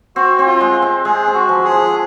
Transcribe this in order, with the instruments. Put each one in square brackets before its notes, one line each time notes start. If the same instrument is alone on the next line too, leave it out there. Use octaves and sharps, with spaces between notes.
[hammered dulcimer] C4 [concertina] F#4
[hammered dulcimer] C4
[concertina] F4
[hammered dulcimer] G#3
C4
[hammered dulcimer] G#3 [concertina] G#4
[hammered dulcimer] C4
[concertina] F#4
[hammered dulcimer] F3
[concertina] G#4
[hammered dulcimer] F3